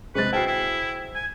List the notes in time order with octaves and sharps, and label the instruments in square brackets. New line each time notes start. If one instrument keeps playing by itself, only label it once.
[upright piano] C3 G#3 A6 [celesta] G#4 C5 [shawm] B4
[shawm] E4 [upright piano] F#4 G#4 G5 [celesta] C5 F6 C7
[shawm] E4
G#5